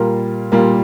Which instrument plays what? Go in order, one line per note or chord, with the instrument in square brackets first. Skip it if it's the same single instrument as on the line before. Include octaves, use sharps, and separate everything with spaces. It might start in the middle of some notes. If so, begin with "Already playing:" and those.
Already playing: [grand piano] A#2 G3 A#3 F4 A#4
A#2 G3 A#3 F4 A#4